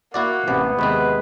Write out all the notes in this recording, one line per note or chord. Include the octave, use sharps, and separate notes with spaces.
A#3 E4 F#4 D5 F#5
A1 C3 B3 D5
D#2 C3 G#3 C4 B4